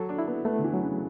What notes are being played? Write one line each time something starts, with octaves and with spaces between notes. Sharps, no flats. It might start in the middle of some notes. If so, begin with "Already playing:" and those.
Already playing: F#3 A4
D4
E4
B3
A3 B3
D3
E3
F#3
C#3